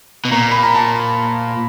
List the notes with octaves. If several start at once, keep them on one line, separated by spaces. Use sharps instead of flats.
B2
A#2 A#5
B5
A#5
A5